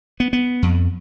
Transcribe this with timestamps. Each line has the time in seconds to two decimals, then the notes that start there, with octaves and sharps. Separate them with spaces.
0.20 B3
0.33 B3
0.62 F2